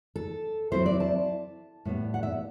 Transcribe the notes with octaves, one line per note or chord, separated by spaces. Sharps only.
A4
F#3 C4 E4 C5
D5
A5
A2 G3 B3
F#5
E5